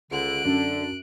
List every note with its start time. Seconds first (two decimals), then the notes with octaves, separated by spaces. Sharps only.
0.11 C#2 D3 F#6 D7
0.45 F#2 D3 D4